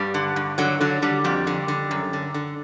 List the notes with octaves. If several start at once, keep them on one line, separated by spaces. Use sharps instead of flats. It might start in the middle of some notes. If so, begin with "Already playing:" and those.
Already playing: G2 G3
D3
G2
D3 F#3
D3 F#3
D3 G3
F2 G3
D3
D3
F#2
D3
D3